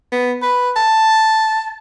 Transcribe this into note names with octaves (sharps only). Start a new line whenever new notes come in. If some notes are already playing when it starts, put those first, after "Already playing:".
B3
B4
A5